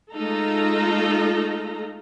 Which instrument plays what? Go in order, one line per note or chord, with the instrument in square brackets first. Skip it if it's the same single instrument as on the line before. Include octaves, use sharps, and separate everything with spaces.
[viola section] G#3 A3 D#4 F4 A4 A#5